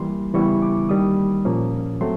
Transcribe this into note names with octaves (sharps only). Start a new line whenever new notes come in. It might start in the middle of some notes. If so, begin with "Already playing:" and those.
Already playing: E3 G3 A#3 C6
C#3 E3 G3 B3 E4 C#6
D6
D#3 G3 A#3 D#4 D#6
A#2 F3 A#3 C#4
F#3 A3 C4 C6